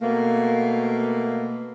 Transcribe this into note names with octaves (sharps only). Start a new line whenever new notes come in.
B2 A3 A#3